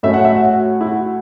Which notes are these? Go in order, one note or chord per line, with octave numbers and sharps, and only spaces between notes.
A2 F#3 A3 C#4 E5
F#5
E5
F#4
F#4
E4
F#4